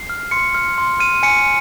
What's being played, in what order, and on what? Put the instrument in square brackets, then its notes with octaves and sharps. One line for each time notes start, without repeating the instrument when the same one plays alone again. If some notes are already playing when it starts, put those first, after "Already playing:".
Already playing: [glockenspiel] C7
F6
C6 C#7
F6
C6
F6 D#7
G#5 C#7